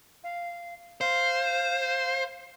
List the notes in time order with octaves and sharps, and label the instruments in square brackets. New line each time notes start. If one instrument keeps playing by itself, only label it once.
[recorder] F5
[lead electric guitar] C5 [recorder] F5